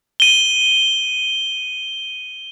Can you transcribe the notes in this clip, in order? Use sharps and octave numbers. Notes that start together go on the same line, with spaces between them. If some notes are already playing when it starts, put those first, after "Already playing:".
D#7 G7